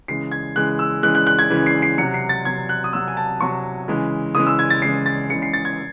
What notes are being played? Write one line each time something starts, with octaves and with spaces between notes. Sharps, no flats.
C#3 E3 G#3 C7
G#6
C#3 E3 G#3 F#6
E6
C#3 E3 G#3 F#6
F#6
F#6
G#6
C#3 E3 G#3
C7
C7
C3 F#3 C#7
C7
A6
C3 F#3 G#6
F#6
D#6
C3 F#3 E6
G#5
A5
C3 F#3 C#6
C#3 E3 G#3
C#3 E3 G#3 D#6
E6
G#6
A6
C#3 E3 G#3 C7
A6
C#3 E3 G#3 C#7
C7
A6
G#6